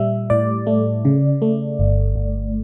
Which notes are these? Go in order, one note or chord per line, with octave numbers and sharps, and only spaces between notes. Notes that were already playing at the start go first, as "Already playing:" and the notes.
Already playing: A#2 G3 E5
A2 D5
A3
C#3
A3
G1
G1